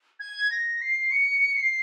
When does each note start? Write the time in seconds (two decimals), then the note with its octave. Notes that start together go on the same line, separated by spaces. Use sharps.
0.20 G#6
0.51 A#6
0.81 C7
1.12 C#7
1.57 C7